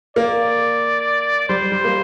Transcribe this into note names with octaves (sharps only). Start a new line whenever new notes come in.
A#3 D5
G3 C5
G3
A#3